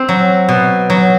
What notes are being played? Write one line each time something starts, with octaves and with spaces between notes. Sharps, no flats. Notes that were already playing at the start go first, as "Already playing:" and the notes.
Already playing: C4
F#3
B2
F#3